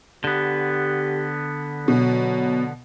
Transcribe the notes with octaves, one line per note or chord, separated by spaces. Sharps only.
D3 B3 G4
B2 F#3